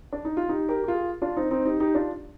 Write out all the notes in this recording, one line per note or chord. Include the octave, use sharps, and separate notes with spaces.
D4
D#4
F4
D#4 G4
G4 A#4
G4
F4 G#4
D4 F4
C4 D#4
C4 D#4
D#4 G4
D#4 G4
D4 F4